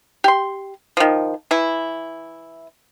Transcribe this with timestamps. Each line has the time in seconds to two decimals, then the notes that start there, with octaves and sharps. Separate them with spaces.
0.24 G4 C6
0.97 D#3 F3
1.51 E3 E4